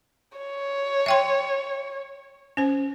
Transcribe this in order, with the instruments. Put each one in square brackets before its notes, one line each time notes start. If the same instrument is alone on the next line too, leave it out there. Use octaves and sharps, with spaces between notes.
[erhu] C#5
[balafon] E5 G5 C6
C#4 C5